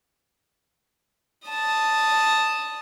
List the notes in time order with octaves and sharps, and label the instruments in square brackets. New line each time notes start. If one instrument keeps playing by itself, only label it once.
[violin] A5 D#6